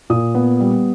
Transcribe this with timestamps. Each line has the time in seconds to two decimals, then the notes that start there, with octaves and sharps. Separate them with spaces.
0.10 A#2 D#6
0.35 B3
0.60 G3